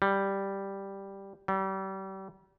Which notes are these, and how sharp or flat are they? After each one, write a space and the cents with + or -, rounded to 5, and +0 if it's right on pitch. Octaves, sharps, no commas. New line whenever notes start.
G3 +0
G3 -35